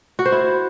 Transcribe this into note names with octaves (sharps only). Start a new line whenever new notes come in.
F#4
C5
E4